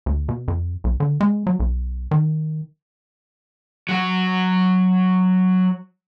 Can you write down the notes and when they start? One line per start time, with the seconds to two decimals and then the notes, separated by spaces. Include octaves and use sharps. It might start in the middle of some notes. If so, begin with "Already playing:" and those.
0.06 D2
0.29 B2
0.48 F2
0.84 B1
1.00 D3
1.21 G#3
1.47 F#3
1.60 B1
2.11 D#3
3.89 F#3 F#4